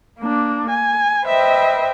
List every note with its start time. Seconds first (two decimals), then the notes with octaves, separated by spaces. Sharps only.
0.19 A#3 D4
0.68 G#5
1.24 B4 C5 D#5 E5 G5